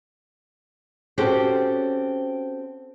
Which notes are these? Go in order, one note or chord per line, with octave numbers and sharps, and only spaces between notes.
C4 C#4 F#4 G4 A4 C5